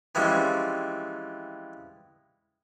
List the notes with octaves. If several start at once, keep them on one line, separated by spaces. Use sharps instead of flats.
E3 F3 G3 G#3 C4 C#4